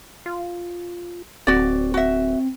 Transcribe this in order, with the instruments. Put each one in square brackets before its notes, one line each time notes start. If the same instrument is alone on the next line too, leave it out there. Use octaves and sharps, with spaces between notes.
[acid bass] F4
[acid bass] D1 [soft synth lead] C4 [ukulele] F#4 D5
[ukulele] F#4 E5